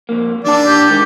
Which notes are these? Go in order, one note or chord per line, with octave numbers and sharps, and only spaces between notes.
F2 G#2 A#3
E3 D4 D5 A5
G4
D#3 G#3 A#4